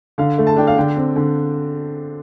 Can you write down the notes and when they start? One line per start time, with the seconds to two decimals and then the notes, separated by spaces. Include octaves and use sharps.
0.18 D3 F5
0.38 A3
0.47 A5
0.56 D4 G5
0.67 F5
0.77 D3 G5
0.96 C4
1.16 D3